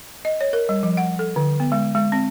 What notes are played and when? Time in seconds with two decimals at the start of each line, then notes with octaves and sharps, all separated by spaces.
0.25 D#5
0.41 C#5
0.53 A#4
0.69 G3
0.83 F3
0.97 F#5
1.19 A4
1.36 D3
1.60 B3
1.72 G#3
1.95 G#3
2.12 C4